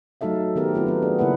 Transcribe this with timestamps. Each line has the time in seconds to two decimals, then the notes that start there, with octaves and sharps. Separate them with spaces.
0.21 F#3 A3 D#4 A4 E5 F5
0.56 D#3 B3 G4 A#4
0.74 A3 B3 C4 F4 B4
0.87 F#3 B3
1.02 D4 G#4
1.19 C#3 A#3 E4 B4 F#5